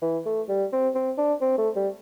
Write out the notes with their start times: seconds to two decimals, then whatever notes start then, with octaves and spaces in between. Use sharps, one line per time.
0.02 E3
0.26 A3
0.49 G3
0.72 C4
0.95 C4
1.18 D4
1.41 C4
1.58 A3
1.76 G3